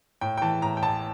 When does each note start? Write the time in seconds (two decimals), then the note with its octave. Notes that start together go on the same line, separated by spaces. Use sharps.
0.21 A2 G5
0.37 G5
0.42 E3 A5
0.62 A2 A#5
0.77 G5
0.82 A1 A5